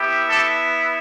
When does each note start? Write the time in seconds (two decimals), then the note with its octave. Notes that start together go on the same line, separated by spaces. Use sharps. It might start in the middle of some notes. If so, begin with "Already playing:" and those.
Already playing: B3 E4 G4
0.30 G4 A4